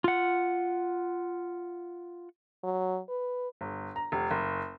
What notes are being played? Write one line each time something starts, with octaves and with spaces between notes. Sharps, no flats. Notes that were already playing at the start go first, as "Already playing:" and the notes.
F4 F#5
F#3
B4
G1
A#5
F1
F#1